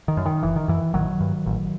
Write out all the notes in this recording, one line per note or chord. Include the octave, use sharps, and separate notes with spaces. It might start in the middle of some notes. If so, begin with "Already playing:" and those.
D#3
F#2
D#3
F#1 E3
D#3
F#2 E3
A1 D#3 F#3
G2
A1